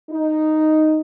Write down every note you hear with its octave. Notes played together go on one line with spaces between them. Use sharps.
D#4